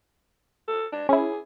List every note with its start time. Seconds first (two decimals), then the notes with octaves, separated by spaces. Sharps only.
0.68 A4
0.92 D4
1.09 C#4 E4 G#4